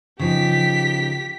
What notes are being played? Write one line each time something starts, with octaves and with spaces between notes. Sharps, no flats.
C#3 F3 D#4 G4 B6